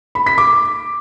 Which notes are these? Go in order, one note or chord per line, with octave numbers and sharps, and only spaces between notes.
B5
B6
D6